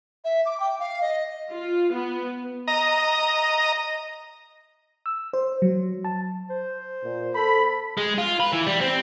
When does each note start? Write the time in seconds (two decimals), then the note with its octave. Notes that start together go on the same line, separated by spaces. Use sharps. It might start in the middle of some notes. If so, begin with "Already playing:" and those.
0.24 E5
0.46 D6
0.60 G5
0.79 F5
1.01 D#5
1.51 F4
1.92 B3
2.68 D#5 A#5
5.06 E6
5.33 C5
5.62 F#3
6.05 A5
6.50 C5
7.04 A#2
7.35 A4 B5
7.97 G#3
8.18 F4
8.40 B4
8.53 E3
8.67 G3
8.81 C4